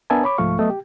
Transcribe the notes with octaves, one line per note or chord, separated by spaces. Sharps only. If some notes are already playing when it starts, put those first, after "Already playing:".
B3 D4 A#4 E5 G#5 A5
C#5 B5 D6
C2 G#2 F3 A3 F5 C#6
F#3 A3 B3 D#5
G4